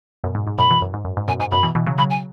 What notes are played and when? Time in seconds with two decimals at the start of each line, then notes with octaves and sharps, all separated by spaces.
0.24 F#2 B2
0.35 G#2
0.47 G#2
0.58 F#2 B2 B5
0.70 B2 E3
0.82 F#2
0.94 G#2
1.05 F#2
1.17 G#2
1.28 F#2 B2 G#5
1.40 G#2 G#5
1.51 F#2 B2 B5
1.63 B2 E3
1.75 B2 E3
1.87 C#3 F#3
1.98 C#3 F#3 B5
2.10 G#5